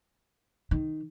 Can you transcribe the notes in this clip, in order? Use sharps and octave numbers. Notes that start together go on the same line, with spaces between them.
D#3